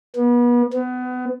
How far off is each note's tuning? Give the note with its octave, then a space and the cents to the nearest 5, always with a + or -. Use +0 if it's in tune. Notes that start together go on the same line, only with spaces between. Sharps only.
B3 -35
B3 +25